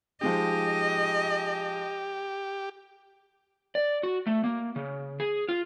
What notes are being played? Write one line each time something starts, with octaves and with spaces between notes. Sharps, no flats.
F3 G#3 D#4 G4 D#5
D5
F#4
A3
A#3
C#3
G#4
F4